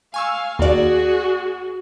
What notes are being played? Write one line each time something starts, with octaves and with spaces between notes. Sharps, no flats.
F5 G#5 C#6 E6
D#2 F#4 G#4 D5